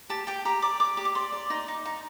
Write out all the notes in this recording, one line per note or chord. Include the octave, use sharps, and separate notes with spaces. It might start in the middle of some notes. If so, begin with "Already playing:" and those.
G4 A5
G4 G5
G4 A#5
D5 D6
D5 D6
G4
D6
D5 C6
D5
D#4
D#4
D#4